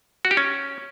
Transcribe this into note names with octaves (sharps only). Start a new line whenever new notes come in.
F#4
G4
C#4